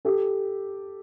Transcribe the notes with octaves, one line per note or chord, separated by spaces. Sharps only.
G4 A4